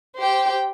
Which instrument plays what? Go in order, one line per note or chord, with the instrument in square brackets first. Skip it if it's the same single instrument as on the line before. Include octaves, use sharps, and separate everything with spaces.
[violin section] G4 C5 G5